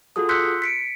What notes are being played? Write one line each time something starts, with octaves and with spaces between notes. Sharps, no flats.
F4 F#4 G#4 A4 D#6
C6 E6 F#6 G6 B6 C#7
B6 C#7 D7